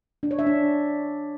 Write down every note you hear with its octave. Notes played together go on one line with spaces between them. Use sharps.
D4
C#5
E5
D4